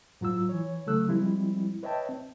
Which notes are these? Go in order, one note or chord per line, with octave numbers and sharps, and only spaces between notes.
G#2 F#3 F4 E6
E3 C#5
C#3 F#3 A3 A4 E6 F#6
F3 G3 G#3 C4 E4
B4 C#5 D#5 E5 G5 A5
C4